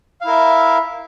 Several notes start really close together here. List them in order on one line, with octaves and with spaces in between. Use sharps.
F5 E4 A#4 E5